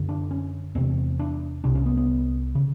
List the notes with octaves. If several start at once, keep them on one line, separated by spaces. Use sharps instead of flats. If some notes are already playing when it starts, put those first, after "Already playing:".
Already playing: F#2 D3
D4
C#4
E2 C3 C4
D4
C2 C3 D4
C#4
B3
B3
C#3